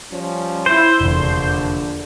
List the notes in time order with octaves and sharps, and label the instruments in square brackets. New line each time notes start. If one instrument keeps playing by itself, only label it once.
[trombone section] F3 G3 C#4
[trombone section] E4 [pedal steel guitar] C5
[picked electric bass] F1 E2 [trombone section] A#1 D3